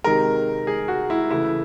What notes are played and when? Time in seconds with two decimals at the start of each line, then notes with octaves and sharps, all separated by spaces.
0.04 C3 D#3 G#3 A#4
0.67 G#4
0.88 F#4
1.10 E4
1.31 C#3 E3 A3 E4